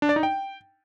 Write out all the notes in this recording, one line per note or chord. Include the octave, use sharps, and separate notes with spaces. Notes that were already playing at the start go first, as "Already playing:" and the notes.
D4
D5
D#4
G5